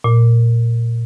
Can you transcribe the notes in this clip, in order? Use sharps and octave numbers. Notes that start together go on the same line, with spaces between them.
A#2